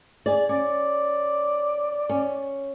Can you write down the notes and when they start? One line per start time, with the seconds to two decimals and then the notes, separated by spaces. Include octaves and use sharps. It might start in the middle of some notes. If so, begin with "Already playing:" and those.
0.26 G#4 D5
0.49 C#4 D5
2.09 C#4